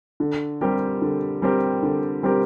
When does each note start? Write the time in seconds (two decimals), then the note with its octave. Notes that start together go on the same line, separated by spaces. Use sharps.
0.20 D3
0.61 G3 C4 G4 A#4
1.02 D3
1.42 G3 C4 G4 A#4
1.83 D3
2.23 G3 C4 G4 A#4